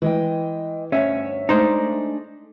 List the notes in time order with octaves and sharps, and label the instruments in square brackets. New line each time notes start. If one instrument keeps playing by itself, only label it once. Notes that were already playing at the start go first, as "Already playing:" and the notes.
[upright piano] E3 [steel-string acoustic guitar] G#3 D#5 G5
[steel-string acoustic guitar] D2 G2 C#5 [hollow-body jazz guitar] C#4 [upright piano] E5
[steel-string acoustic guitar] G#3 A3 D4 [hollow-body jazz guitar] D#4 C5